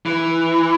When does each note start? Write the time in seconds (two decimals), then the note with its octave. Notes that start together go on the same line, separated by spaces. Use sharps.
0.06 E3